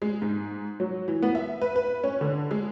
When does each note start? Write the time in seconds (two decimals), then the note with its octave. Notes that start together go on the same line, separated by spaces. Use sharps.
0.02 G#3
0.22 G#2
0.80 F#3
1.08 E3
1.22 B3
1.35 E5
1.61 B4
1.76 B4
2.04 C#4
2.21 D3
2.51 G#3